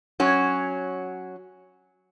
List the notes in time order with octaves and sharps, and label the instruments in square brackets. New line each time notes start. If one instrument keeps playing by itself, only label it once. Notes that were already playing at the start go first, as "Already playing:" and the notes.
[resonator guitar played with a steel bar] F#3 C#4 F#4